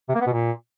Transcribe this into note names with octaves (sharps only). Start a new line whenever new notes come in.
C3
A#3
B3
B2
A#2